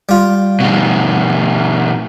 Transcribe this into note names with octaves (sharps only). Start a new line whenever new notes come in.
G3 F4
B2 D3